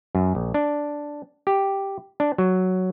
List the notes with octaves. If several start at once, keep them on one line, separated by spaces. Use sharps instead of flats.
F#2
A#1
D4
G4
D4
F#3